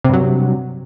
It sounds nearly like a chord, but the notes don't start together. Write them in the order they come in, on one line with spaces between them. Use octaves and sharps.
C3 G2 F#3